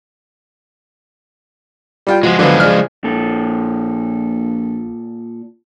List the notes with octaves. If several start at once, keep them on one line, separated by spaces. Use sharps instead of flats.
G3 F4 G5
F3 G#3 F#4
D3 F3 F#3 G#3 B3
C#3 D4 F6
A#1 A#2 A4